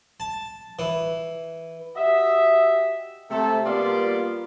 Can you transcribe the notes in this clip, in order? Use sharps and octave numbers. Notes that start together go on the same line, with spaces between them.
A5
E3
F#4 G4 D#5 E5
C3 A3 A4
G3 A#3 B3 F4 D5 C6